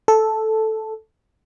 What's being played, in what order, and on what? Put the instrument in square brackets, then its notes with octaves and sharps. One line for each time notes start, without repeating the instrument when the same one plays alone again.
[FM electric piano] A4